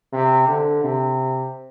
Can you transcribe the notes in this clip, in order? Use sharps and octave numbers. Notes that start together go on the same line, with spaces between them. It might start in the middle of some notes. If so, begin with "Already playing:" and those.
C3
D3
C3